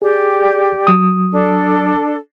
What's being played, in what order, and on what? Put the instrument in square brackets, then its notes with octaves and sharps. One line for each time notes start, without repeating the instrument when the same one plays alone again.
[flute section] G4 D5 [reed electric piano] G#4
[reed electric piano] F#3 D#6
[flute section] D4 A4